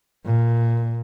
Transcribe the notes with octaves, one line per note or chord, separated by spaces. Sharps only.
A#2